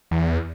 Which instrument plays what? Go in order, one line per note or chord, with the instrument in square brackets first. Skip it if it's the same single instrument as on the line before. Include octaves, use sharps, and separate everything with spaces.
[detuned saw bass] E2